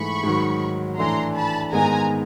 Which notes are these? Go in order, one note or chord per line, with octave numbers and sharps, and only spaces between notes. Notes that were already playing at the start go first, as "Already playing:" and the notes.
Already playing: G#2 E3 A3 B5 C#6
G#2 D#3 F#3
A2 E3 A3 D4 A#5 C6
A5 B5
G#2 D#3 G#3 B3 D#4 G#5 A#5